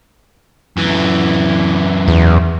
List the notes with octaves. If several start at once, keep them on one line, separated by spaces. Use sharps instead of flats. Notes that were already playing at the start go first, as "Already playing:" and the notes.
F#2 E3
E2